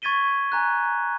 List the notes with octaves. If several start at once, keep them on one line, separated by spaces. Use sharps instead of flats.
C#6 G#6 A6 B6 D#7 G7
G#5 A#5 F#6